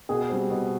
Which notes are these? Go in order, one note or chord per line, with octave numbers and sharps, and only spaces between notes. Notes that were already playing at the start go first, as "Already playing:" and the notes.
B2 G#4
G3 C4
B2